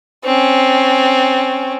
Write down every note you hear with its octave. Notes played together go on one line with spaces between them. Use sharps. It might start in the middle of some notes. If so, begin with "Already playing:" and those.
C4 C#4